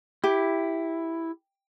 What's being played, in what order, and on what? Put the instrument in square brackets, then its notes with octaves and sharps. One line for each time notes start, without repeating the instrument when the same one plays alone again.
[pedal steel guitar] E4 [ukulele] G4